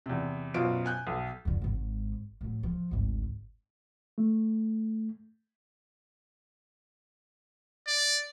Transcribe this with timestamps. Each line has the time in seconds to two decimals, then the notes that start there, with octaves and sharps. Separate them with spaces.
0.06 E2 C3
0.54 F#2 B2 F4 C5 F5 D7
0.86 G#5 F#6 G6
1.07 B1
1.45 F2 D3
1.62 G#1 G#2
2.41 A2 F#3
2.63 F3
2.91 G#1 D2
4.18 A3
7.87 D5